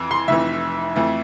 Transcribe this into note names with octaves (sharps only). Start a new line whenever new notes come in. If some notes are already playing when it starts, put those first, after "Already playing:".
Already playing: F2 E3
C6
F1 F2 E3 E5
F2 E3 A3